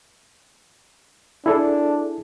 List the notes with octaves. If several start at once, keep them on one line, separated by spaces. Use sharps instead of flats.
D4 E4 G#4 A4